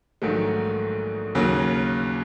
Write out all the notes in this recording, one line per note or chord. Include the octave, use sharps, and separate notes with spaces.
A#1 G#2 D#3 F#3 A3
D#2 C#3 F#3 A#3